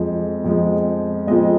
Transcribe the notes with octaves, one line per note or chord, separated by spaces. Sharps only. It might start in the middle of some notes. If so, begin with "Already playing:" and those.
Already playing: F2 F3 G#3
F2 F3 G#3
F2 F3 G#3 D#5